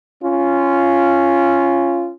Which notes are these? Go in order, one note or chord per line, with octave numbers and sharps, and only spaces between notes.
C#4 F4